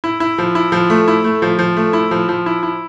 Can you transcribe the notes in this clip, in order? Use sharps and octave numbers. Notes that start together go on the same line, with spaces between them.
E4
E4
F3
E4
F3
A3
E4
A3
F3
F3
A3
E4
F3
F3
E4
E4